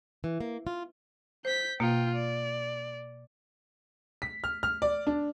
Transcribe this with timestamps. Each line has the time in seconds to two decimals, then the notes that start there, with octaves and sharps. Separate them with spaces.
0.24 E3
0.41 A#3
0.67 F4
1.45 C5 G6 B6
1.80 B2 A#3 F4 G5
2.15 D5
4.22 B6
4.44 F6
4.63 F6
4.82 D5
5.07 D4